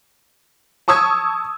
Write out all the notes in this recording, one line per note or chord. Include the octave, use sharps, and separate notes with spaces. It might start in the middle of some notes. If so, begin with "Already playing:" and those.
A5 C#6 D#6 E6 G#6